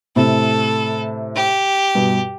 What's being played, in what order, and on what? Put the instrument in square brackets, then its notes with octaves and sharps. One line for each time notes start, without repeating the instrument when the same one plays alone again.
[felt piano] A2 C3 [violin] A4
[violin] G4
[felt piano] G2 B2